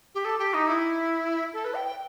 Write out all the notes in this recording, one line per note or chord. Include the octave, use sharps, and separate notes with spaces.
G4
A4
G4
D#4
E4
A4
B4
G5
G5